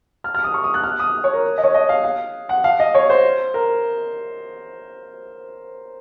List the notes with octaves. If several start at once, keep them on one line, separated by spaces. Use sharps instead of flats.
F6
F6
D#6
C#6
D#6
F#6
F6
D#6
C#5
A#4
D#5
C#5
D#5
F5
F5
F#5
F5
D#5
C#5
C5
A#4